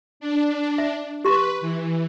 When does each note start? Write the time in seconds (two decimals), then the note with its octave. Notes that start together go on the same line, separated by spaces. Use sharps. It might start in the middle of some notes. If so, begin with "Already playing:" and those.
0.20 D4
0.78 E5
1.25 G4 B4 C6 C#6
1.61 E3